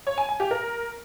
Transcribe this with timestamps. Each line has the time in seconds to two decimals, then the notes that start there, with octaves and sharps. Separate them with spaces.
0.07 C#5
0.18 G#5
0.29 G#5
0.40 G4
0.51 A#4